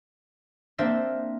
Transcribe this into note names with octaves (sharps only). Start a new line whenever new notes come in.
A#3 C4 D4 C5 E5